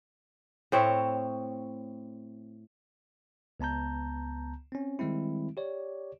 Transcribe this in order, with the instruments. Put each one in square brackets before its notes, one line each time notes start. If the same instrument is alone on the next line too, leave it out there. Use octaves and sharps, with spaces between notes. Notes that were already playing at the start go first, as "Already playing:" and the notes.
[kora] A2 C4 C#5 E5
[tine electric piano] C#2 B3 A5 A#5 G6
C4 C#4
D#3 G3 G#3 C4 E4
G4 C#5 D5